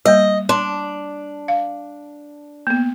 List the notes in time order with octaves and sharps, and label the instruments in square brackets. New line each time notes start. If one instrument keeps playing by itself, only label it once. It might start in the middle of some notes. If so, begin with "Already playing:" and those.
[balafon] G3 A#3 [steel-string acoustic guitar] D#5
[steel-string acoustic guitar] D4 [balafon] C6
[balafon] F5
A#3 B3